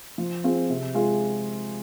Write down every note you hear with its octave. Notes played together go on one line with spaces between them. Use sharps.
F3
C4 F4 G#4
C3
G#3 F4 G#4